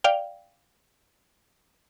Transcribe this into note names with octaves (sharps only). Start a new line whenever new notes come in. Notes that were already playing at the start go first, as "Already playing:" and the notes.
D5 F5 G5